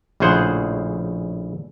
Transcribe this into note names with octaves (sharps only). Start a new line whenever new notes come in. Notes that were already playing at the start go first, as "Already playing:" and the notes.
A#1 A2 C#3 G#4 C5 F#5